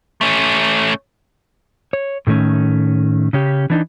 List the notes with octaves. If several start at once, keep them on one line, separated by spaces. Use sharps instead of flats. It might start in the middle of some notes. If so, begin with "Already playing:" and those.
A3 C#4
C#5
A2 D#3 A3 C#4
C#3 C#4 G4
E3 D4 D#4